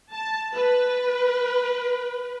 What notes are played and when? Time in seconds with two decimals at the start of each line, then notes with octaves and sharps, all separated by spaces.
0.14 A5
0.53 B4